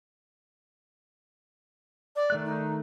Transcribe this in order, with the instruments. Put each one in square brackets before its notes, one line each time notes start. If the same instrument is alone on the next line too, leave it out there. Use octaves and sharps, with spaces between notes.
[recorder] D5
[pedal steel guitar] D#3 A3 F#6
[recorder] D#4